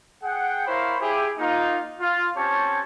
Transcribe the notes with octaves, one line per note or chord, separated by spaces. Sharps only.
G#4 F#5 G5
E4 A#4 C5 C#5 F5 B5
E4 G4 G#4
A#3 D#4 F4
F4
C4 C#4 G4 C#5 A5